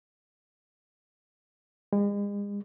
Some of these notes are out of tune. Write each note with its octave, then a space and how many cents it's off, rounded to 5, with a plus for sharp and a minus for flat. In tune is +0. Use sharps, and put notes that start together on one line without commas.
G#3 -40